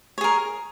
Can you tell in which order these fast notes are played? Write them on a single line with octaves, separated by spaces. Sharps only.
C#5 G#4 A#4